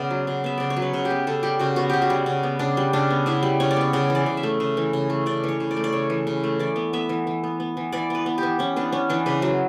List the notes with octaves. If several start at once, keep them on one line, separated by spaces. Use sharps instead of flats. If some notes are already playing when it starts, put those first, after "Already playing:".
Already playing: C#3 B3 D5 E5
F#3
C#3
B3 E5
C#3 D5
C#5
F#3
B4
C#3
G4
B3
C#3 A4
G3 G4
C#3 F#4
B3 F#4
C#3 G4
F#4
G3
C#3
B3
C#3 D4
G3
C#3 D4
B3
C#3 E4
G3
C#3 C#5
D5
B3 C#5
C#3 D5
E3
D5
C#3
E5
A3
C#3
E3
C#3
A3
C#3 D5
E3 C#5
C#3
D5
A3
D5
C#3 C#5
E3
C#3
A3
E3 D5
B3
B3 E5
E3
E3
B3
B3
E3
E3 D5
B3 B4
B3
G4
E3
E3 C#4
B3 D4
B3 C#4
E3 D4
C#3 B4
F#3